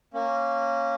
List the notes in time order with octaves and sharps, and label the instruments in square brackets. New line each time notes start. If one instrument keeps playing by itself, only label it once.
[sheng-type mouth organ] A#3 C#4